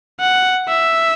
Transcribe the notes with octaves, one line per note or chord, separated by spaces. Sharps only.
F#5
E5